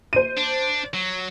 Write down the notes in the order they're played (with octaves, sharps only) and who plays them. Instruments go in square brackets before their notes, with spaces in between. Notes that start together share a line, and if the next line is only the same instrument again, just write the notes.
[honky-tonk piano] C5 D#7
[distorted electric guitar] D4
F#3